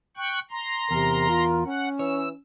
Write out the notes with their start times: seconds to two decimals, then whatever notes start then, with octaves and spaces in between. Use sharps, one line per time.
0.17 G5 C#6 F#6
0.51 A#5 C6
0.91 E2 C3 A#4
1.29 F4
1.66 C#4 F#5
1.99 E3 C#5 E6